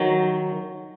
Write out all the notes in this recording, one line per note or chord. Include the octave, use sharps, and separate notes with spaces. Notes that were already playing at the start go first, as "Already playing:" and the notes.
Already playing: D#3 F#3